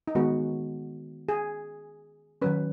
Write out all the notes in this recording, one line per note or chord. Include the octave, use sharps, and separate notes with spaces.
D#4
D#3 G#3 B3 F#4
G#4
D#3 F#3 C#4 B4